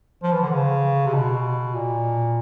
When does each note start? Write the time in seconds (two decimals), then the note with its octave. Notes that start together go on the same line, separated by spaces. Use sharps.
0.23 F3
0.32 E3
0.43 D3
0.52 C#3
1.06 C3
1.14 B2
1.74 A#2